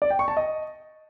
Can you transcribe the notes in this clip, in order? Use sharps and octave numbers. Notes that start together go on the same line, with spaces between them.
D5
G5
C#6
A5
D#5